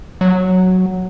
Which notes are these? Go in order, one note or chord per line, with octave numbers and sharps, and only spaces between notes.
F#3